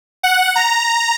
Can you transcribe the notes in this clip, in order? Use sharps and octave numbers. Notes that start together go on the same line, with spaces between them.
F#5
A#5